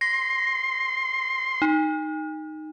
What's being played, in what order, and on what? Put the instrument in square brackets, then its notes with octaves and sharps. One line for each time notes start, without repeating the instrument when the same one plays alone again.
[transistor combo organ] C6 [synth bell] A#6
[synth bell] D#4